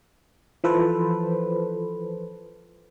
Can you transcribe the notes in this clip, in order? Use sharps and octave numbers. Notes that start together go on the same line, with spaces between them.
E3 F3 A4 B4 C5